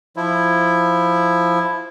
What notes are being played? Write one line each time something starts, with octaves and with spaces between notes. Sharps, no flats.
F3 E4